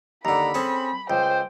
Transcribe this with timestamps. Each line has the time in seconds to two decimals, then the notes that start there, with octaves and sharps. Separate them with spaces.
0.25 D#2 D3 A#5 B5
0.54 C4 C#4 G#4 A4
1.10 C#2 C5 G5